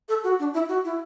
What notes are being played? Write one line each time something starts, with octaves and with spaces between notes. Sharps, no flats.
A4
F#4
D4
E4
F#4
E4